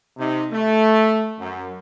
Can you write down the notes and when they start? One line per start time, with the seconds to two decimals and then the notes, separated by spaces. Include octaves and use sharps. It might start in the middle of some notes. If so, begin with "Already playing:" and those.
0.18 C3 D#4
0.51 A3
1.40 F#2